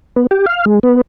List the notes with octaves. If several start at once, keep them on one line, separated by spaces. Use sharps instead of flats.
B3
G4
F5
G#3
B3